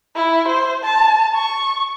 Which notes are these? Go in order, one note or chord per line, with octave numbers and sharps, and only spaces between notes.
E4
C5
A5
C#6